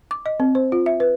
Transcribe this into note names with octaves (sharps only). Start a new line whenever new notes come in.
D6
D#5
C4
C5
F4
E5
B4